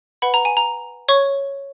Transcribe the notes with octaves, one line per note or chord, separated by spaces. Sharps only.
B4 F#5 B5
A#5
G#5
A#5
C#5 C#6